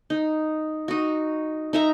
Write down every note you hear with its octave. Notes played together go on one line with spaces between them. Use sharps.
D#4
D#4 F#4
D#4 E5 A#5